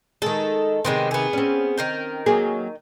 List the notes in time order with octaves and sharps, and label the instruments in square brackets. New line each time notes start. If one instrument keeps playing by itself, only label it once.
[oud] D#3 G#3 [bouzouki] A4
[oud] C3 D#3 [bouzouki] G#3 B3 C4
[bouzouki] B3 G#4
[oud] C4 C#4
[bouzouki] D#3 A#4 G5
[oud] F#3 A#3 G#4